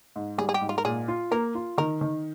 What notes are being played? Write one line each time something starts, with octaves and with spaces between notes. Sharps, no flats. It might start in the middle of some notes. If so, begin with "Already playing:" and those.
G#2
G3 G#4
G#4
G4
G#2
F4
A#4
A#2 G#4
F4
A#3 A#4
F4
D#3 A#4
D#3